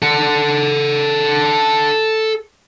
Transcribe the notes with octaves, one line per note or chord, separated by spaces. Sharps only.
A4 F#5